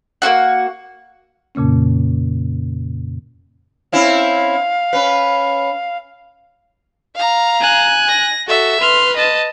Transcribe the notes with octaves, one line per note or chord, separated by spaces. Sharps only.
A#3 E4 F#4 F#5
F2 A#2 C#3 A#3 C#4
C4 C#4 E4 F5
C#4 B4
F5 A#5
G#5 F#6
A#6
F#4 A4 E5
B4 C6 F6
D#5 A5